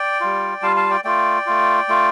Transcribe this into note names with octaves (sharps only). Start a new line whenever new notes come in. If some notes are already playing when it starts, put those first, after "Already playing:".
Already playing: D5 G5
G3 F4
G3 F4 F5 A5
F5 A5
D5 G5
A3 F4 D5 G5
A3 F4
A3 F4